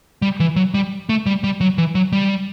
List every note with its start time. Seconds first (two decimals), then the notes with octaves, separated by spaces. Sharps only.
0.22 G3
0.40 E3
0.56 F#3
0.74 G3
1.09 A3
1.26 G3
1.44 G3
1.61 F#3
1.78 E3
1.95 F#3
2.12 G3